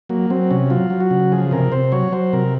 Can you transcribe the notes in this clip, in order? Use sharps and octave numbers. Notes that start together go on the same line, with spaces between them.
F#3 A#3
F#3 C4
C3 C#4
F#3 F4
F#3
F#4
C#3
F3 G#4
C3 A#4
C3 C5
F#3 C#5
F#3 C5
C3 A#4